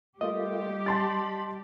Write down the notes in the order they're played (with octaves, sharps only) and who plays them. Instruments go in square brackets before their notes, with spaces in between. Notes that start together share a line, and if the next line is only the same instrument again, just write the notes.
[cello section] G3 G4 [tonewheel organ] A3 A#3 F4 [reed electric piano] D#5
[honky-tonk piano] A5 C6 A6 [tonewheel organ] B5